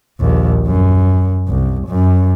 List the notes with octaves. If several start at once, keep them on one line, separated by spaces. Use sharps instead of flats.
A#1 D#2
F#2
C2
F#2